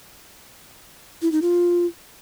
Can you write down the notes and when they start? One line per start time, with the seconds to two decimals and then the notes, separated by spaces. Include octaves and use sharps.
1.22 E4
1.32 D#4
1.42 F4